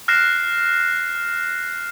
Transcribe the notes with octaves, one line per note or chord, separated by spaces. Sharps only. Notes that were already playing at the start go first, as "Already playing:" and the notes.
F6 F#6 A#6 C7 E7